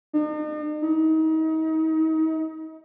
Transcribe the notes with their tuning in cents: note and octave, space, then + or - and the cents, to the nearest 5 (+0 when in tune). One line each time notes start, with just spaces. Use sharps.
D#4 -45
D#4 +35